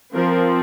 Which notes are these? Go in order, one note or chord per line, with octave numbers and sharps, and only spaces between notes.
F3 C4 A#4